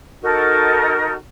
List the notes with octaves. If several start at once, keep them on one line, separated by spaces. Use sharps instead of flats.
D#4 F#4 A4 A#4